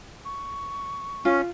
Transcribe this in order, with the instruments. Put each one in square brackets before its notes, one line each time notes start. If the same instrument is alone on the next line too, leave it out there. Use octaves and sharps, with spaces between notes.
[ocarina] C#6
[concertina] C#4 [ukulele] F4